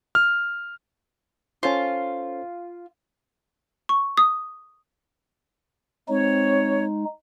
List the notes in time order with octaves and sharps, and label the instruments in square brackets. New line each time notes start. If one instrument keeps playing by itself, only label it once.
[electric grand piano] F6
[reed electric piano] C#4 A4 C5 [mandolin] F4
[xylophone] C#6
D#6
[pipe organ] G#3 D#4 [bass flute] C4 [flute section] C#5